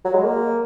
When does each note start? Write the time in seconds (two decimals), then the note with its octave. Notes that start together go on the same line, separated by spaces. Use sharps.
0.05 F#3
0.14 G#3
0.24 A#3